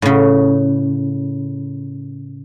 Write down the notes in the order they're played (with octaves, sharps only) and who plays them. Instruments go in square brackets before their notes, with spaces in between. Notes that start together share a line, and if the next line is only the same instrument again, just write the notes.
[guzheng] A2 C#3